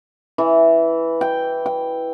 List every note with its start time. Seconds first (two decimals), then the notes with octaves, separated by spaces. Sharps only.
0.38 E3
1.21 G5
1.66 G5